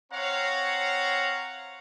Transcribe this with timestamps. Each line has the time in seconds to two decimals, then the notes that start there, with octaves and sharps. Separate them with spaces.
0.12 C4 C#5 F5 F#5 A#5